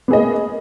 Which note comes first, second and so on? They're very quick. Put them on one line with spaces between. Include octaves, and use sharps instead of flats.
B3 G#4 D#5 A#3